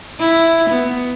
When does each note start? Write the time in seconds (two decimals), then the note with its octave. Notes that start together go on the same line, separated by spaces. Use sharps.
0.20 E4
0.70 B3